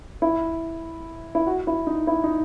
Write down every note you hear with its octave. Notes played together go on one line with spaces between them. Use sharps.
E4
E4
F#4
E4
D#4
E4
D#4